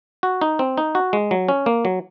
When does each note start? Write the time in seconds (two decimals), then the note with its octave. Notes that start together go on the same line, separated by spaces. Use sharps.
0.23 F#4
0.41 D#4
0.59 C4
0.77 D#4
0.95 F#4
1.13 G#3
1.31 F#3
1.49 C#4
1.66 A#3
1.85 F#3